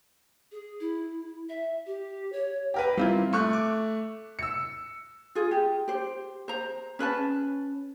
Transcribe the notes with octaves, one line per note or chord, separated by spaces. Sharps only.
G#4
E4
E5
G4
C#5
G4 A#4 B4
G3 C4 E4 F4
A3 C#6 F#6
D6
E6 C#7
F4 G#4
G4
G4 C5
C5 A#5
C#4 B4 D5 A5